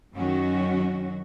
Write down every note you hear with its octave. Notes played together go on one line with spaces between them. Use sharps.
F#2 D#3 F#3 C#4 F#4